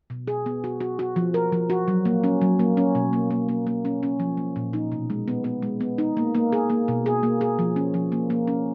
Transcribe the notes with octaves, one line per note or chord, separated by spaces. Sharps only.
B2
G#4
B3
F#4
F#4
F#4
F3
A#4
F3
F#4
F#3
A#3
C#4
F#3
A#3
C#4
B2
A#3
A#3
A#3
A#3
C#4
C#4
F3
A#3
A#2
D#4
B2
G#3
B3
B3
G#3
B3
D#4
A#3
A#3
G#4
A#3
B2
G#4
A#3
G#4
F3
C#4
F3
A#3
A#3
C#4